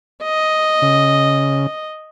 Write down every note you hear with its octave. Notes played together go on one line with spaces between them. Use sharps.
D#5
C#3